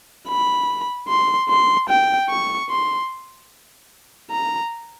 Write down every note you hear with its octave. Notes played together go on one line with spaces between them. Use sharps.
B5
C6
C6
G5
C#6
C6
A#5